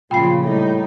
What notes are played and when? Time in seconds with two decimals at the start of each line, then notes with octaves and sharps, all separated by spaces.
0.11 A#2 C#3 F3 F4 G5 B5 C7
0.43 A2 G3 D#4